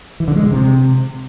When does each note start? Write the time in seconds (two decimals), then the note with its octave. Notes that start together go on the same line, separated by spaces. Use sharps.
0.20 E3
0.28 D3
0.36 G#3
0.43 B2
0.51 C3